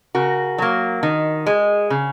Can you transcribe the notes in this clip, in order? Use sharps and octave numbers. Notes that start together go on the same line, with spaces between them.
C#3 F#4 A#4
F#3 A#3
D#3
G#3
C#3